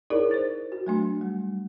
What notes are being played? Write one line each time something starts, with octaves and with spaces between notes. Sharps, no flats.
D#4 E4 G#4 A#4 C#5 D5
C5 A6
F#4
F#3 A3 D4
G3